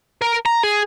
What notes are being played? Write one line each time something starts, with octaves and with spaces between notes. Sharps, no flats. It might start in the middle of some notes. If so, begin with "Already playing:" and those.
A#4
A#5
G#4